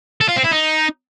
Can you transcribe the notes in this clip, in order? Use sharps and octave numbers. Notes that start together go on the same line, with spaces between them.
A4
F4
C4
E4
D#4